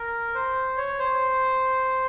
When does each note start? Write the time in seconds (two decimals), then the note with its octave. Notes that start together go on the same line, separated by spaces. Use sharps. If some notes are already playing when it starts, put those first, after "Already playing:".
Already playing: A#4
0.35 C5
0.77 C#5
0.99 C5